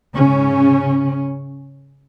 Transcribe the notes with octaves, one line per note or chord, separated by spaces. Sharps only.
G#2 C#3 C#4